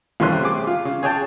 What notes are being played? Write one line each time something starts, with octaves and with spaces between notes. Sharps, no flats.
C2 E3 A3 C#4 C6 F#6
C3
G#4 D6
F4
C#3
G#4 C#5 G5 A5